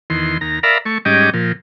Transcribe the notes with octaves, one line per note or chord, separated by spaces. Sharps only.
E2 D#3 C6
D#2 A#5
A#4 D5 E5 F5 A#5 B5
A3 C#6
G#2 G3 C#4 G4 D#5 D6
A#2 F3